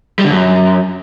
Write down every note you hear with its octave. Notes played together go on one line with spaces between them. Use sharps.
G3
D3
F#2